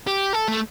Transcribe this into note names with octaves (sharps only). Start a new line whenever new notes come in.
G4
A4
A3